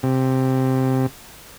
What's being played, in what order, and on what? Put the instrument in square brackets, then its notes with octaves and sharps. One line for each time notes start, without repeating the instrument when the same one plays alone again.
[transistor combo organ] C3